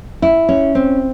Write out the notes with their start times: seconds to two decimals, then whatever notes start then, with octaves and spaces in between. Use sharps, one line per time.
0.22 E4
0.49 C#4
0.75 C4